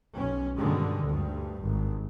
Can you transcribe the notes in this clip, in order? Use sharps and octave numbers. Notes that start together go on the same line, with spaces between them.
B1 C#4
G2 B2 D3 D#3 G3 G#3
D2 G2
G#1